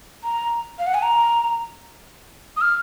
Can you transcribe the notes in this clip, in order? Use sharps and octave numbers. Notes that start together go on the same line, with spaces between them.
A#5
F5
F#5
G#5
A#5
D#6
F6